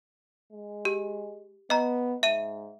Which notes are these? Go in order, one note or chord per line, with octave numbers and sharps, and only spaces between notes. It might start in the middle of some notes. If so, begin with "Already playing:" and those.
G#3
G4
B3 D#5 A#5
G#2 E5 D#7